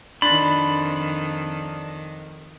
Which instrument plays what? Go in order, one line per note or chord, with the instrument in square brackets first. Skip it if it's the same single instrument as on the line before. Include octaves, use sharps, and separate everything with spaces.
[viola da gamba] F2 D#3 [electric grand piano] D4 C6 A6 [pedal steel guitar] B5